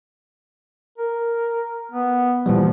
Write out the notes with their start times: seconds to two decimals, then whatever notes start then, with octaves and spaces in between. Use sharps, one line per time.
0.98 A#4
1.91 B3
2.46 A#2 E3 F3 G3